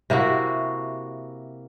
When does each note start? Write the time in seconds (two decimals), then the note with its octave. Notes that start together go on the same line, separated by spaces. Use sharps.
0.10 C3 A#3 E4 F#4